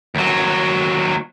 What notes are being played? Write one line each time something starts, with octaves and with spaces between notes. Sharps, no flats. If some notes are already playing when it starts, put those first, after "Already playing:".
D#2 F#3